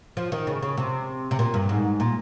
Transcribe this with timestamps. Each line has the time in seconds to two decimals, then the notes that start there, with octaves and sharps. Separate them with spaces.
0.17 F3
0.32 D#3
0.47 C#3
0.62 C#3
0.77 C3
1.31 C3
1.39 A#2
1.54 G2
1.69 G#2
2.00 A#2